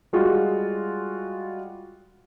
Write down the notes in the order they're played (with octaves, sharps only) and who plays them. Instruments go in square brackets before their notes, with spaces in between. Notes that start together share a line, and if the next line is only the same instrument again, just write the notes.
[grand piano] G3 G#3 F4 F#4